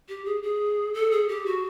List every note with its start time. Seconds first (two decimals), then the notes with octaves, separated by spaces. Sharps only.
0.09 G4
0.25 G#4
0.43 G#4
0.94 A4
1.11 G#4
1.28 G4
1.46 F#4